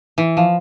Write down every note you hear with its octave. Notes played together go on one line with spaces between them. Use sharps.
E3
F3